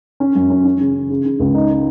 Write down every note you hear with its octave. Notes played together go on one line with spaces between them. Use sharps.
C#4
F#2
C#4
C#4
C#3
C#3
C#3
C#3
C#2
D#4
D#4